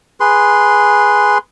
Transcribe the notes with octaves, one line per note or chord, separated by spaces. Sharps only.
G#4 B4 C6